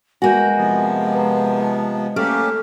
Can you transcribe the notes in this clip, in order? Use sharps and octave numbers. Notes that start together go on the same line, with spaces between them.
G#3 A#3 F#4 G#5 G6
C3 F3 B3
B4 A5 A#5
A3 A#3 C#4 G4 F6